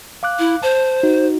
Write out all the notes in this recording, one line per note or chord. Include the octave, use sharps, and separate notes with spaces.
F5 D6 F#6
E4
C5 A5
D#4 F#4